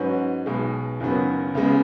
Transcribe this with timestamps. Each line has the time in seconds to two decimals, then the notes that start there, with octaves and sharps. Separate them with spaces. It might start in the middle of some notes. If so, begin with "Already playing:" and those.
Already playing: G#2 F#3 C#4 F#4 B4
0.46 B1 B2 G#3
1.00 F#1 F#2 D#3 F#3 B3
1.55 C#2 C#3 G#3 B3